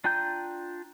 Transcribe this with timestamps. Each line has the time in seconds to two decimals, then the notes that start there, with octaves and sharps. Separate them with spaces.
0.04 D4 F4 G5 A#5 G6